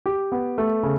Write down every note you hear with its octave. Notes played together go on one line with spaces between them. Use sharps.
G4
B3
A3
C#3